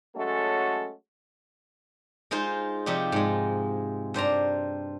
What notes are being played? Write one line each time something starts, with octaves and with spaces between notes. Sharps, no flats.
F#3 G#3 A3 C#4 F#4 A4
G#3 D#4 F4 C5 C6
C3 F3 D#4 G4
G#2 G#3
G2 C5 D5 A#5